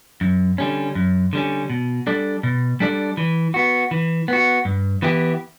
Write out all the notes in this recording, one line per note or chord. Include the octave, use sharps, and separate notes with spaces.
F#2
D3 G3 C#4
F#2
D3 G3 C#4
B2
G3 D4 A4 D5
B2
G3 D4 A4 D5
E3
B3 F#4
E3
B3 F#4
G2
E3 B3 E4 G4